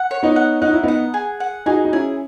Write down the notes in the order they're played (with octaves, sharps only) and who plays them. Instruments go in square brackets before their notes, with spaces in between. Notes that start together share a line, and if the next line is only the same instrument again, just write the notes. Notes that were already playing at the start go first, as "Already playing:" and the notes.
Already playing: [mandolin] F#5
C#5
[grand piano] B3 D#4
[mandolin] F#5
[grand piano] D#4 [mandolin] F#5
[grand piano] E4
[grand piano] B3 D#4 [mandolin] F#5
[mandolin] G#4
F#5
[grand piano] D#4 F#4 [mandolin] G#4
[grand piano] D#4
[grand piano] C#4 E4 [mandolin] G#4